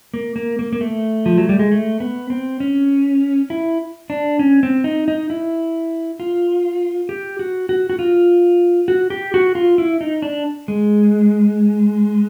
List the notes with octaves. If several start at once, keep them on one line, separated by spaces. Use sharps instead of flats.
A#3
A#3
A#3
A#3
A3
F3
F#3
G3
G#3
A3
B3
C4
C#4
E4
D4
C#4
C4
D#4
D#4
E4
F4
G4
F#4
F#4
F#4
F4
F#4
G4
F#4
F4
E4
D#4
D4
G#3